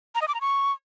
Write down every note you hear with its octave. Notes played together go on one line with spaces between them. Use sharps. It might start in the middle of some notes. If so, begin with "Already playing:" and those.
A#5
D#5
D6
A#5
C#6